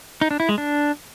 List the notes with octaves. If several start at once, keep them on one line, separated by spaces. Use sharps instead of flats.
D#4
D4
E4
G#3
D4